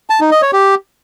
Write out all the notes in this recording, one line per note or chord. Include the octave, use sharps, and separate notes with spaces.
A5
D#4
D#5
C#5
G4